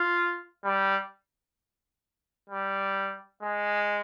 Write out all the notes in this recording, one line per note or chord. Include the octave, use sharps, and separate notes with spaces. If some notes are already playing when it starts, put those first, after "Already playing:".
Already playing: F4
G3
G3
G#3